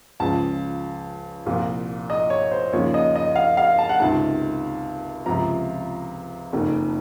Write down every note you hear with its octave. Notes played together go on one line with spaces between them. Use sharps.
C#2 C#3 F3 A5
C2 A#2 F3
D#5
C#5
C5
D#2 C#3 F3 C#5
D#5
D#5
F5
F5
A5
F#5
C#2 C3 D#3 A5
C#2 C3 F3 A#5
F#1 F2 D#3